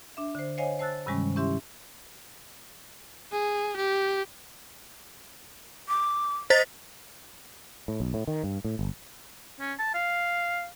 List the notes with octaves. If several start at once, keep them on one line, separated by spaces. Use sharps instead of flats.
D4 E5
D3 C5
C5 C#5 D#5 F5 G#5
C5 A5 E6 F#6 A6
G2 C3 D#3 G3 G#3 C#4
C#4 E4 G4 E5 C6
G#4
G4
D6
C5 D#5 A6 B6
A2
B1
A2
D#3
G2
A2
G1
C#4
A5
F5